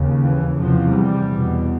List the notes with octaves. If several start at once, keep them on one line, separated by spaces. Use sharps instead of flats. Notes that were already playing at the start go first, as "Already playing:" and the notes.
Already playing: D#2 C#3
E3
E2 C3 F3
G3
E2 B2